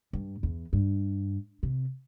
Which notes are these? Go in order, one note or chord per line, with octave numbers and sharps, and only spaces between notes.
G2
E2
G2
C3